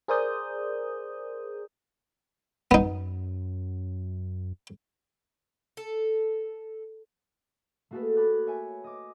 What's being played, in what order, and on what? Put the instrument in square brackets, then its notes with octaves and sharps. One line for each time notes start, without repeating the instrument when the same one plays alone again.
[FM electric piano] G#4 A#4 C5 D5 D#6 G6
[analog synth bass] F#2 [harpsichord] B3 D#4
[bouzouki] A4
[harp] A3 A#3 F#4 G#4 A4 B4
A5 B5 D6 F#6 G#6 A6
C#5 E5 G5 G#5
D#5 D6